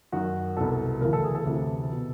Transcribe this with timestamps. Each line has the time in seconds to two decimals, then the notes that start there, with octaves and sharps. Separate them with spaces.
0.12 F#2 D#3 F#4
0.57 C2 B2 A4
1.01 D2 C#3 E3 A#4
1.13 A4
1.24 G#4
1.35 A4
1.45 D2 C3 E3
1.92 B2